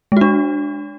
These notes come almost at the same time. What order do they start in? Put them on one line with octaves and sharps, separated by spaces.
G#3 F#4 D4